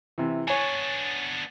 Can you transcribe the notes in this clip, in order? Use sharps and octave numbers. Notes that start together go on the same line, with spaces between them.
C3 E3
B3 D4 C#5 G#5